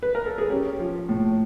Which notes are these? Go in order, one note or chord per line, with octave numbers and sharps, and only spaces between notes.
B4
A#4
A4
G#4
C#4 G4
F3
A2